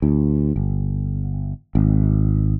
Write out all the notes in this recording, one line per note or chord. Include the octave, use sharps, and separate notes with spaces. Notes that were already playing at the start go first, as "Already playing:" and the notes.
D2
G1
G#1